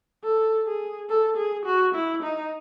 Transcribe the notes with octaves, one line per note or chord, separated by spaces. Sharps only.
A4
G#4
A4
G#4
F#4
E4
D#4